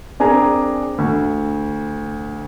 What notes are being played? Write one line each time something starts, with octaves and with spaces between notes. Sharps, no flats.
C4 D4 G#4 A#4 G#5 A#5
D2